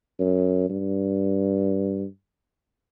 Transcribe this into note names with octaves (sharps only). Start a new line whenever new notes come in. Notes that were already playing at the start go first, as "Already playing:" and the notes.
F#2
G2